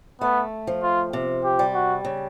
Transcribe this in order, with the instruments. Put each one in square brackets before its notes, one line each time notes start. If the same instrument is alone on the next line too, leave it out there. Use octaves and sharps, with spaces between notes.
[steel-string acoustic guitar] A3 [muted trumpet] B3
[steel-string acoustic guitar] F3
[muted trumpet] F4
[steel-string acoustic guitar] C3
[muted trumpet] G4
[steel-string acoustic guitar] G3
[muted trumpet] F#4
[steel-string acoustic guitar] C#3